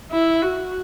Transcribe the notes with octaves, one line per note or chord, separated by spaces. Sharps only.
E4
F#4